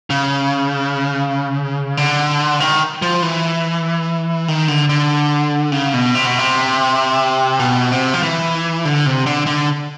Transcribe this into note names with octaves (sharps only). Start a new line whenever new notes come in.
C#3
D3
D#3
F3
E3
D#3
D3
D3
C#3
B2
C3
B2
C3
B2
C3
F3
E3
D3
C3
D3
D3